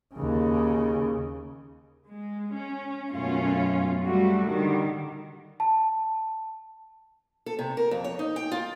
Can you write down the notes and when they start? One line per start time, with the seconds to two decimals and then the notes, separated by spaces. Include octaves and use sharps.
0.15 D#2 C#3
2.12 G#3
2.54 C#4
3.13 F#2 B2 A3 C#4 F4
4.04 G3 A3 F#4
4.47 D3 D#3 G3
5.60 A5
7.46 A4
7.59 C3
7.77 A#4
7.91 F2
8.04 C#5
8.19 D#4
8.36 G5
8.52 F4